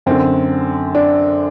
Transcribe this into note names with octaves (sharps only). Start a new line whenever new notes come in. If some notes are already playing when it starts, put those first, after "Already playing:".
F#2 D3 C4
D4